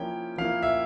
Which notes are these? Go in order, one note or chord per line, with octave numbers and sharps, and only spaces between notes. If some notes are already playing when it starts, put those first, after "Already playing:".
Already playing: F3 A#3 C#4 E4 G5
F3 A#3 C#4 E4 F5
E5